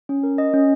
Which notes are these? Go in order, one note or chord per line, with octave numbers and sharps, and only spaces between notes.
C#4
A#4
D#5
C#4